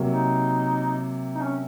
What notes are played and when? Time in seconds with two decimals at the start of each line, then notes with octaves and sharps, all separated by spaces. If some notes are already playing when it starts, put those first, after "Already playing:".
Already playing: C3 F#3 A#3
0.10 D#4
1.35 D#4
1.41 C#4